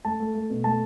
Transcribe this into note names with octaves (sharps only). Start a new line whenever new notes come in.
A3 A5
A3
A3
B2
A3 A5